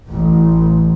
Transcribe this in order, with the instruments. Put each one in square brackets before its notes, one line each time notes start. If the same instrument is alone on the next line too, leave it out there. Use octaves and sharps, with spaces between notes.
[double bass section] A1